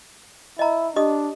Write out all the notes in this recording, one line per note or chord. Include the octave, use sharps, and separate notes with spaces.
E4 D#5 A#5
D4 G4 D#5 D#6